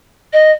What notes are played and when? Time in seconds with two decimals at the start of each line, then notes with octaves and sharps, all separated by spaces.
0.33 D#5